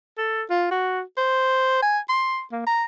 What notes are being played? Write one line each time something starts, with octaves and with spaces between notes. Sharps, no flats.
A4
F4
F#4
C5
G#5
C6
A#3
A#5